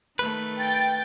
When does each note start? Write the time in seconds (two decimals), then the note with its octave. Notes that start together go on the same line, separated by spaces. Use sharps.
0.19 D#3 A3 B4
0.57 G5 A6